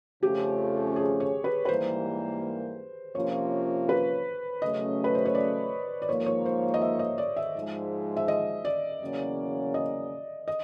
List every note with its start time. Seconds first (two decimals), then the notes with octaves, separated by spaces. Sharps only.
0.23 F2 C#3 F3 A3 C#4 G4
0.96 G#4
1.20 C#5
1.44 B4
1.65 B4
1.69 G#2 E3 G3 A#3 C5
3.15 C3 F3 A#3 C#4 F4 C#5
3.89 B4
4.62 C#3 F#3 A3 C#4 D#5
5.04 B4
5.15 C5
5.25 C#5
5.35 D5
6.02 D5
6.09 G#2 F3 A#3 C#5
6.26 C#5
6.46 C5
6.74 D#5
6.82 E5
6.99 D#5
7.18 D5
7.36 E5
7.55 G#2 F3 G#3
8.17 E5
8.28 D#5
8.65 D5
9.01 E2 C#3 F#3 A#3 C#4
9.74 D#5
10.48 D#5